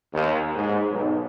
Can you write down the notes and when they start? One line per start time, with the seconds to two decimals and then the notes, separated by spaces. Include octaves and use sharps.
0.13 D#2
0.56 G#2
0.90 B1